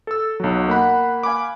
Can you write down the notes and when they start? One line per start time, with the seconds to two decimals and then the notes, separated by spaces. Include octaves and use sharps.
0.07 A4 E6
0.40 B1 F#3
0.68 A#3 F#5 B5 F#6
1.23 F5 G#5 B5 D6